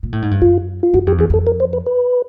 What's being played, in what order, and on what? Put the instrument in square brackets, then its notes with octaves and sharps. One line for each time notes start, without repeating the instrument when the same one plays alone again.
[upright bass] A#2
A2
G#2
G2
[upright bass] F#2 [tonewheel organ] F4
[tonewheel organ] F4
[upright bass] F#2 [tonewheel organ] F#4
[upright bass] F2 [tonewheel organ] G4
[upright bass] E2 [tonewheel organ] G#4
[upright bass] F2 [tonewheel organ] A4
[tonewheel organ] A#4
C5
B4
B4